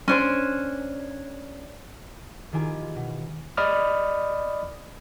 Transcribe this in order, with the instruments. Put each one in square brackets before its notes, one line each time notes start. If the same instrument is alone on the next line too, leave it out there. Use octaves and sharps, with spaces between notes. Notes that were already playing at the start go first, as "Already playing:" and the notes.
[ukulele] C#4 D4 C5
[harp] D#3 E4 F4 G4 G#5
B2
[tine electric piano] D5 D#5 B5 D#6 F6